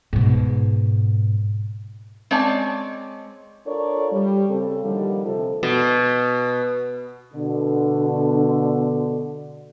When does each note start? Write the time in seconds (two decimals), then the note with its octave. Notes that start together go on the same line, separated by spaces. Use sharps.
0.13 G#2 B2
2.31 G#3 C4 C#4 D5 A5
3.67 D4 F4 A4 A#4 C#5 D5
4.12 G3
4.49 C#3 C4 A4
4.84 A#2 D3 D#3 F3 G3
5.25 C3 F3 A4
5.63 B2
7.34 B2 D3